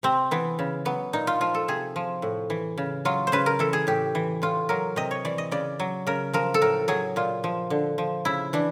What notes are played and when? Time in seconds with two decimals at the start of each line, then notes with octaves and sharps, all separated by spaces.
0.03 C3 C4
0.31 E3 B3
0.59 C#3
0.85 F#3 B3
1.13 A#2 D#4
1.27 F4
1.41 F3 F4
1.54 A4
1.68 C3 G#4
1.96 F3
2.22 A2
2.50 E3
2.78 C#3
3.05 F#3 F4
3.27 C5
3.32 C#3 B4
3.46 A#4
3.59 E3 A4
3.73 G#4
3.87 A2 G4
4.15 E3
4.42 A2 F4
4.69 F#3 A#4
4.96 C3 D#5
5.11 C#5
5.25 E3 D5
5.38 D#5
5.51 C#3 D5
5.80 F#3
6.07 C#3 A#4
6.33 F3 A#4
6.54 A4
6.62 A2 A#4
6.88 F#3 G#4
7.16 A#2 F4
7.44 F3
7.70 D3
7.98 F3
8.25 C#3 E4
8.53 E3 D4